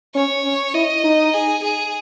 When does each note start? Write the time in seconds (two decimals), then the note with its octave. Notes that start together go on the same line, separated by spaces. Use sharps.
0.15 C#4 C#5
0.44 C#4
0.74 E4 D#5
1.04 D#4
1.33 G#4
1.63 G#4